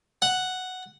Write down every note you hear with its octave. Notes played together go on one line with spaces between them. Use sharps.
F#5